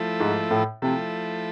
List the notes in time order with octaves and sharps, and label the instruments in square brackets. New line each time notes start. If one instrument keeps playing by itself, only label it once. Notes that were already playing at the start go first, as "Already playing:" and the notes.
Already playing: [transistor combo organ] F3 A3 E4 A4
[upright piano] G#2
A2
[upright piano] C3 [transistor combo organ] F3 A3 E4 A4